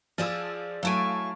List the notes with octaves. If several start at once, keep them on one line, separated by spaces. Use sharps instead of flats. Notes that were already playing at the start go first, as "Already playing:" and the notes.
F3 G#4 D5 A5 E6
F#3 A3 E4 F5 G#5 A5 C#6 D7